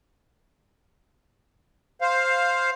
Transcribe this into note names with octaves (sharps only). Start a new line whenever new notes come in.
C5 F5